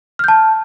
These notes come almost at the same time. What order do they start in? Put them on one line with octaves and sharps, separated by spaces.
F6 G6 A5